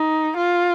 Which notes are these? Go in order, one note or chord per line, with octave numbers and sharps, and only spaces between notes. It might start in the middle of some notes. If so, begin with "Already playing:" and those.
Already playing: D#4
F4